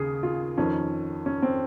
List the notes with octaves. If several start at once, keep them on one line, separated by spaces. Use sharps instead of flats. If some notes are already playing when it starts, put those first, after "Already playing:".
Already playing: D#2 C#3 G#4
F4
F2 D#3 C#4
C#4
C4